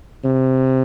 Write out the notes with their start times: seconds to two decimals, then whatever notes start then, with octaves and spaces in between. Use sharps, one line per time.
0.25 C3